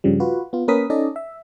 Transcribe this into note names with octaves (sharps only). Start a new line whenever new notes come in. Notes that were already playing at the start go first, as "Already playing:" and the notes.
G2 C#3 F3 G3
F4 F#4 B4
B3 F4
A#3 C#4 A#4 B4 D#6 B6
C#4 D#4 A4 D5 D#5
E5